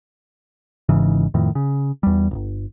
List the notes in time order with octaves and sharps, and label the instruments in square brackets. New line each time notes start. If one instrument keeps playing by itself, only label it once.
[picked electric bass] G#1 G#2 C#3 E3
F2 A2 D#3
C#3
E2 G3
D1 G1